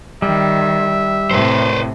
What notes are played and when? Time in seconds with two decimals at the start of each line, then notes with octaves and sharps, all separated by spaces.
0.22 D#3 G3 E5
1.31 A2 C3 B4 C5